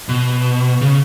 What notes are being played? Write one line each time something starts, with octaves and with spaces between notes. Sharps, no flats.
B2
C#3